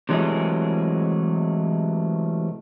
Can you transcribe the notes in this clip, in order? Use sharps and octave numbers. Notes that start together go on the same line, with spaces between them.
C3 E3 F#3 G#3 A3 G#4